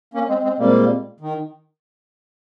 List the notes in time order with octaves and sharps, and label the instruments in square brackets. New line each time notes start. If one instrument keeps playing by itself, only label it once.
[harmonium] A#3 C#4
G#3 C4
G#3 C4
[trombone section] A#2 G#3 C4 [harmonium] G3 A#3
[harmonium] D#3